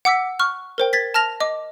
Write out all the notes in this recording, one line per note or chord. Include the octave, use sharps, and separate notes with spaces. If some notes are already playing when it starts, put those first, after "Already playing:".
F#5 D6 E6 B6
C#6 F6 F#6
A#4 C5 G5
G#6 A6 B6
A5 F6 A#6 F7
D#5 D6